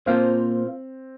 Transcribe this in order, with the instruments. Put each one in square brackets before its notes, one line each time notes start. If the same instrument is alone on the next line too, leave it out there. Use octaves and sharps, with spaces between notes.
[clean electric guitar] A#2 A#3 F4 C5 F5 [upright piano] C4